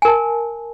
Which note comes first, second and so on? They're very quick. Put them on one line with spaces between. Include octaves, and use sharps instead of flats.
G#5 A#4 A5